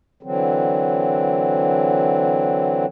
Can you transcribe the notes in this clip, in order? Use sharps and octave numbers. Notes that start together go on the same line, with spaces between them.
D3 E3 F#3 C4